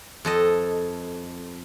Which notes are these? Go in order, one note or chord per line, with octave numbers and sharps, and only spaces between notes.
F2 A4 D#5